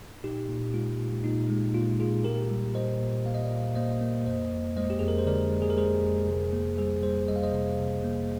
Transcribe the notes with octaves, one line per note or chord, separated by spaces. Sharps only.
A#2 D#4 G4
A#2
G#3 F4
A#2
A#2 D#4
G#3
A#2 F4
A#2 F4 G#4
A#2 G4 A#4
G3
A#2 C5 D#5
A#2
A#3 F5
D#5
D5 F5
A#2
A#3 C5 D#5
A#3
F2 C5 D#5
F2
G#3 C5 D#5
G4
F2 G#4
A#4
C5
D3 A#4 D5
G#3
G#4
A#4
G#3 G#4 C5
F2
C3
A#3
G3 G#4 C5
G3 G#4 C5
G3 D#5
F5
C5 D#5
C3
C3
A#3